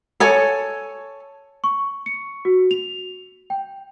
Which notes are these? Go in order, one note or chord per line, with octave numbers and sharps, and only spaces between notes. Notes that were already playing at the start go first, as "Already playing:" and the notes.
A4 C#5 G#5
C#6
C#7
F#4
F7
G5